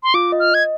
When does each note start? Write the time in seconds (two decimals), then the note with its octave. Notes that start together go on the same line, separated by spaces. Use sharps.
0.03 C6
0.14 F4 D6
0.32 D#5
0.40 F6
0.52 D#5 G#6